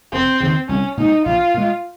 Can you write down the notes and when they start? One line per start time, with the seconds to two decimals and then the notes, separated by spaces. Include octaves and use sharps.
0.13 F1 C4
0.40 D#2 C#3
0.68 C2 C#4
0.97 A#2 G#3 D#4
1.25 A#1 F4
1.54 A#2 G#3